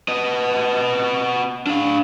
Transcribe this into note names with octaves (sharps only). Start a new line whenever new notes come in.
B3 D#5
D4 F5